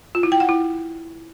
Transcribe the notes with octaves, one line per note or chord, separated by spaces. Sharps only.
F4
E4
G5
F#5
E4